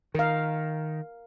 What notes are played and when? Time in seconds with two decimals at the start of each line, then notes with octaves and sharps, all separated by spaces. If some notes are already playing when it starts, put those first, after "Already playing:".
0.15 D#3 A#4 F5